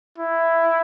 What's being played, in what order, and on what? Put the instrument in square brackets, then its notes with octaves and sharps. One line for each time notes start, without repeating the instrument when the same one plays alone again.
[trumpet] E4